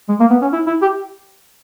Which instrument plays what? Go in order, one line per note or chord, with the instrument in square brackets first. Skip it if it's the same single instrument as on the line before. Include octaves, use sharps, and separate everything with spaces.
[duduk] G#3
A#3
B3
C#4
E4
E4
G4